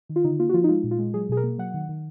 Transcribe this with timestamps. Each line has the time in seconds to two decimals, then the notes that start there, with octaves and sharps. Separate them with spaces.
0.09 D#3
0.16 F4
0.24 D3 D#4
0.40 A#3 F4
0.49 F#4
0.54 F3 F4
0.64 D#4
0.69 G#3 F4
0.84 A#2
0.91 F4
0.99 G#3
1.14 F#3 G#4
1.29 B2 G#4
1.37 A#4
1.43 A#3
1.58 F#3 F#5
1.74 D#3
1.89 D#3